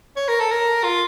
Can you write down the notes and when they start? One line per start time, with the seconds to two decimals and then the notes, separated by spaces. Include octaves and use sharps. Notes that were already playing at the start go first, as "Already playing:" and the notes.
0.16 C#5
0.29 A#4
0.40 A4
0.51 A#4
0.84 F4